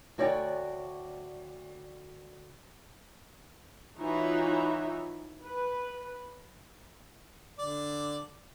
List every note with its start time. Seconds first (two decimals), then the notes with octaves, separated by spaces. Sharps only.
0.18 D2 F#4 C#5 D5 F5 G5
3.99 E3 D#4 F4 F#4 C#5 E5
5.43 B4
7.59 D3 D5